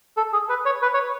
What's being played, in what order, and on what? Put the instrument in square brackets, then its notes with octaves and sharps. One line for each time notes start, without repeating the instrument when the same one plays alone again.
[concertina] A4
G#4
B4
C#5
B4
C#5